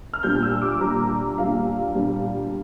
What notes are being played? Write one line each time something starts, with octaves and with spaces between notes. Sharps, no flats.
F6
A#2 G3 D4 G6
E6
D6
A#2 G3 D4 A#5
A#2 G3 D4 F5
A#2 G3 D4